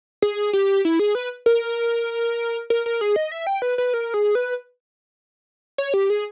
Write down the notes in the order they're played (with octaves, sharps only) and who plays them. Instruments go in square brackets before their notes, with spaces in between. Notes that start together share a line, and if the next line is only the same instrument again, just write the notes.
[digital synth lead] G#4
G4
E4
G#4
B4
A#4
A#4
A#4
G#4
D#5
E5
G5
B4
B4
A#4
G#4
B4
C#5
G4
G#4